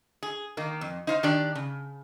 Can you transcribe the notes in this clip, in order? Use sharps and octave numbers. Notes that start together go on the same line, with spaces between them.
G#4
D#3 A#3
F2
D#4 C5 F5
D#3 D4 G4 D5
C#3